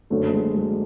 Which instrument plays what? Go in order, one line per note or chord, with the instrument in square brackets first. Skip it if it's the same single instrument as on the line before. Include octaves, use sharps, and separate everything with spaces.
[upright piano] F#1 F#2 D3 [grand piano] A3
[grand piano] G#3
G#3